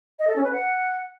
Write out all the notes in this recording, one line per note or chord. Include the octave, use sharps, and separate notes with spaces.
D#5
A4
C#4
B4
F#5